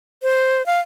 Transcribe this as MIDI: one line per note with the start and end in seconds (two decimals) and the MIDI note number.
0.23 0.65 72
0.66 0.80 77